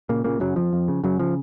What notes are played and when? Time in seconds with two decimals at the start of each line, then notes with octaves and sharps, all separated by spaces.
0.09 A#2 C#3 A#3
0.24 A#2 C#3 A#3
0.40 F#2 C#3 F#3
0.56 F2 F3
0.73 F2
0.88 C#3
1.04 F#2 C#3 F#3
1.20 C#3 F3